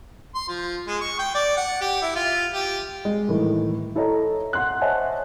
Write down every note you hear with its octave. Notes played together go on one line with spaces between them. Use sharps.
C6
F3
G#3
C#6
G5
D5
F#5
G4
E4
F4
G4
G#3
A2 D#3 E3
E4 A4 C#5 D#5 A#5
F#5 C6 F#6
C5 C#5 D#5 E5 G#5 A5